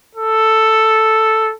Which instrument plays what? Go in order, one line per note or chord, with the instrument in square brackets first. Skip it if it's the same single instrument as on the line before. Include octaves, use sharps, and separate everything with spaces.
[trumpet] A4